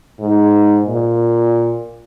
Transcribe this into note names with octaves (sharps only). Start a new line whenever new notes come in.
G#2
A#2